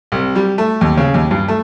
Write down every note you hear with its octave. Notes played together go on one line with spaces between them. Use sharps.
C2
G3
A3
D#2
C#3
D#2
G2
A3